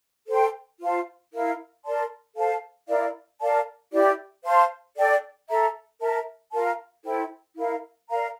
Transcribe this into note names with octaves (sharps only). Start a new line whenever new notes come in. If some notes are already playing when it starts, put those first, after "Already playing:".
A4 C5 G5 C6
F4 C5 F5 A5
E4 A#4 F5
A#4 D5 A5 C6
A4 C5 F5 A5
E4 A#4 D5 F5
A#4 D5 F5 A5
E4 G4 D5
C5 F5 A5 C6
A4 D5 G5
A4 E5 A#5
A#4 E5 A5
F4 A#4 F5 A5
E4 A4 C5 G5
E4 A#4 F5
A#4 D5 F5 A#5